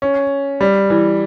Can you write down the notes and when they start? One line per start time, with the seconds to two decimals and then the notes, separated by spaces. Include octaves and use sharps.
0.02 C#4
0.61 G3
0.90 E3